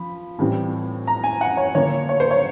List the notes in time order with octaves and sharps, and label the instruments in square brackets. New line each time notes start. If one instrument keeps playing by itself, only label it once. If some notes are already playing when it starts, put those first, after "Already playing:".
Already playing: [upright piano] F3 B5
A2 E3 G3 C4
A#5
G#5
F#5
C#5
D3 F3 A#3 D4 C#5
C#5
C5
C#5